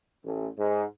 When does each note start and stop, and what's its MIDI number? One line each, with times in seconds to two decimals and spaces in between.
0.24 0.48 33
0.57 0.82 44